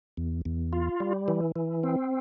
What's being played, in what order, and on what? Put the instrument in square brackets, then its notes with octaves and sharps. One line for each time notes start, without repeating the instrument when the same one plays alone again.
[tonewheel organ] E2
E2
F4
G3
E3
E3
C4